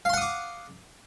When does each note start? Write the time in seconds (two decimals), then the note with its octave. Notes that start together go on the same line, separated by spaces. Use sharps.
0.05 F5
0.09 C6
0.13 F#5
0.17 D#6
0.22 D6